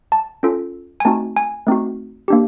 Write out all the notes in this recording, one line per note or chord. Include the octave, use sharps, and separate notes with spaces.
A5
C#4 F4 A4
G#5
A3 C4 D#4 F#4 A5
G#5
A3 C4 D#4 F#4
A#3 D4 G4